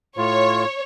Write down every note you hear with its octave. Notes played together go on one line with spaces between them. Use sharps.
A2 F4 C#5